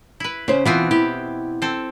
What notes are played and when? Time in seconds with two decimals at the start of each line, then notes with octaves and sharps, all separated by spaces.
0.20 E4 B4
0.48 C#3 C#4 C5
0.65 B2 E3 B3 C4 F4
0.91 E4 G4
1.62 C4 A4